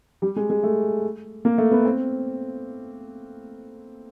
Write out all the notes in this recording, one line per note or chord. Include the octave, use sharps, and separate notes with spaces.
G3
G#3
G#3
A3
A#3
A3
B3
C4